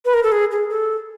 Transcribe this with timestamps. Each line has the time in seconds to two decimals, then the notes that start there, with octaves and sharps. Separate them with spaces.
0.05 B4
0.14 A#4
0.23 A4
0.32 G#4
0.51 G#4
0.70 A4